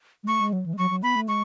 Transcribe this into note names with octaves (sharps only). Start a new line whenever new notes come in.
G#3
A3 C#6
G#3
F#3
E3
G#3
F#3 C#6
F#3
B3 B5
A3
G#3 C#6